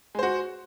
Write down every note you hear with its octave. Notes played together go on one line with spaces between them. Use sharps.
G#3 F#4 C5